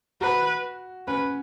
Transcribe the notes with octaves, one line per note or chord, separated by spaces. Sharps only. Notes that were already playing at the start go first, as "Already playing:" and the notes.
F#4 B4
C#4 B4